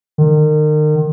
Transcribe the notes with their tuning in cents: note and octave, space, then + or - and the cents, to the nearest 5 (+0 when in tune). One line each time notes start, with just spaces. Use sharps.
D#3 -35